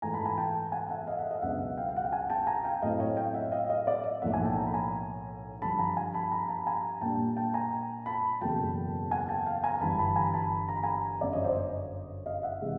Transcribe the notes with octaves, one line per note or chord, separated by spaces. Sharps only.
G#2 E3 A3 G#5 A#5
A5 B5
G#5 A#5
G5 A5
F#5 G#5
E5 F#5
D#5 F5
E5 F#5
D#5 F5
C#2 B2 F#3 B3 D4 E5 F#5
F5 G5
F5
F#5
G5
F#5 G#5
G5 A5
G#5 A#5
F5 G5
A2 F#3 A3 C4 E4 D#5 F5
C#5 D#5
F5 G5
E5 F#5
D#5 F5
D#5 F5
D5 E5
B1 A2 F3 A#3 E5 F#5
F#5 G#5
G5 A5
G#5 A#5
B5
G#5 A#5
G2 D3 F3 A5 B5
G#5 A#5
G#5 A#5
A5 B5
G#5 A#5
A5 B5
G#5 A#5
A#2 G3 A#3 D4 G5 A5
G5 A5
G#5 A#5
A5 B5
F#1 E2 B2 F#3 A3 G5 A5
F#5 G#5
G5 A5
F5 G5
G#5 A#5
G1 G2 E3 A5 B5
A5 B5
G#5 A#5
A5 B5
A#5
B5
G#5 A#5
G1 F#2 D3 D5 E5
C#5 D#5
C5 D5
C#5 D#5
D#5 F5
E5 F#5
C3 E3 G#3